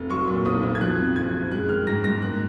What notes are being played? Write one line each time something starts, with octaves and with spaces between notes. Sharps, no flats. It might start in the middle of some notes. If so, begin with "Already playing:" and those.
Already playing: F1
F#3 C#6
A#2
B1 D#6
B1
G#6
F3 F#6
F2
F#1 G#6
F#1
G#3 F#6
D#3 F6
G#2 A#6
G#2 A#6
A#3 F#6